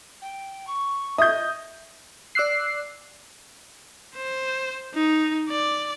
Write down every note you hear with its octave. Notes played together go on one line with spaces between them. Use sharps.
G5
C#6
D#5 E5 D#6 G6
D5 D6 E6 F#6 C7
C5
D#4
D5